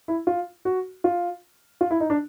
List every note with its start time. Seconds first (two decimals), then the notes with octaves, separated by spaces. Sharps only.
0.08 E4
0.27 F4
0.65 F#4
1.04 F4
1.81 F4
1.91 E4
2.00 D#4
2.10 D4